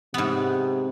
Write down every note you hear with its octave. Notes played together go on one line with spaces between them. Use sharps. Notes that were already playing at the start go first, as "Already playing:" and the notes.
G#2 C3 B3